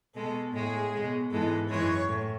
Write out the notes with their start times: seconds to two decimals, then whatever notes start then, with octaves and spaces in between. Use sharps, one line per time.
0.15 B2 G#3 A4
0.54 A2 G#3 G#4
0.93 B2 G#3
1.31 G#2 E3 G#3 A4
1.70 F#2 E3 G#3 C#5
2.08 A2